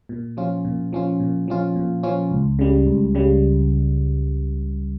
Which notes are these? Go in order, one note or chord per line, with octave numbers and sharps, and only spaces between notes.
A#2
F3 C#4 F4
A#2
F3 C#4 F4
A#2
F3 C#4 F4
A#2
F3 C#4 F4
C#2
C#3 G3
C#2
C#3 G3